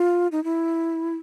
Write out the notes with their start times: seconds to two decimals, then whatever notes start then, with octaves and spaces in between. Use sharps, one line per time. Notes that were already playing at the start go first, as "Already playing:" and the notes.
Already playing: F4
0.32 D#4
0.44 E4